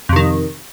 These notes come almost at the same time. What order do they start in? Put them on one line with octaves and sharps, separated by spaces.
F2 C3 D#3